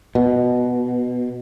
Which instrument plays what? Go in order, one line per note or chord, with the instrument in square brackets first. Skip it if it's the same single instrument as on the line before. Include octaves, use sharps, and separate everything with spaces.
[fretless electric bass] B2